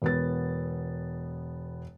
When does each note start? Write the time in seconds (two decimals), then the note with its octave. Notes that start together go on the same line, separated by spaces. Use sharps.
0.02 E1 B3 A6